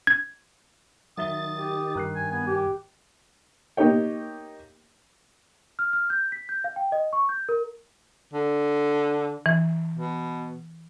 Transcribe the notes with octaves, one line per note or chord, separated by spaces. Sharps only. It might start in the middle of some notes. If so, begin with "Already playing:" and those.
G#6
D#3 F#3 E5 D#6 A6 G7
G4
G2 D#3 F#6 C7
G#5
B3 G#5
G4
A#3 D#4 G4 C#5 G5
F6
F6
G6
B6
G6
F5
G5
D#5
C#6
G6
A#4
D3
E3
B2